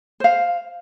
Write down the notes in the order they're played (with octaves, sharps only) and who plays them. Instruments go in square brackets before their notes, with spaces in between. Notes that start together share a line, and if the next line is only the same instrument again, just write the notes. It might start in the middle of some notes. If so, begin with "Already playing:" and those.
[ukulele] C5 F5